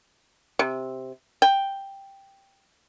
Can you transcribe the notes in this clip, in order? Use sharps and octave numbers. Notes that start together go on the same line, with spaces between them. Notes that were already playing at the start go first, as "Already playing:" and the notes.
C3
G5